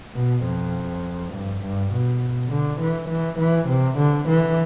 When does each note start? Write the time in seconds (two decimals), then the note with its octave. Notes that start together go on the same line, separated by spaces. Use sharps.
0.14 B2
0.44 F2
1.33 G2
1.62 G2
1.91 B2
2.51 D3
2.80 E3
3.09 E3
3.39 E3
3.68 C3
3.98 D3
4.28 E3